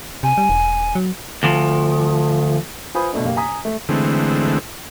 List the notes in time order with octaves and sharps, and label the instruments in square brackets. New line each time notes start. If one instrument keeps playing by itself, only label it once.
[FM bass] C3 [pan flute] G#5
[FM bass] G3
E1
F#3
[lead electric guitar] D2 F3
[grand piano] F4 B4 C5 G#5 B5 D#6
B2 A3 D4
F#1 A#3 G4 F5
G#5 A#5 D#6 B6
A3
[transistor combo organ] D3 E3 G#3 A3 C4